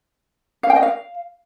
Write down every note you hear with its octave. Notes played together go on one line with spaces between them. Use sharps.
F5
G5
D#5
F5